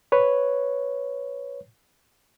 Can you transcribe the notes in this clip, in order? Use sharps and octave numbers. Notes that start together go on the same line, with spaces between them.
B4 C#5